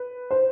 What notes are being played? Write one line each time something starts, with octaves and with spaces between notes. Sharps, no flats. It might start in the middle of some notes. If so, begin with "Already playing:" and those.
Already playing: B4
C5